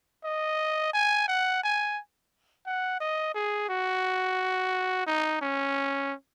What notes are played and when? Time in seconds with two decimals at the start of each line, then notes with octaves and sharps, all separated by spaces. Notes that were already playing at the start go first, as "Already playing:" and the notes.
0.25 D#5
0.93 G#5
1.28 F#5
1.63 G#5
2.66 F#5
3.00 D#5
3.35 G#4
3.69 F#4
5.07 D#4
5.42 C#4